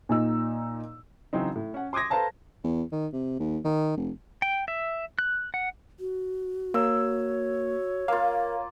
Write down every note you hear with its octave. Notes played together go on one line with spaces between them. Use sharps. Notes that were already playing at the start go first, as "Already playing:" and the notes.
A#2 D#4 E6
C#3 E3 F#3 C4 D#4
A2
C#4 F#5
C6 D6 D#6 G#6 A#6
A4 B4 C5 F5 A5 A#5
E2
D#3
C3
D#2
D#3
F1
G5
E5
F#6
F#5
F#4
A#3 C#5 E6
A#3 F4 A#4 F5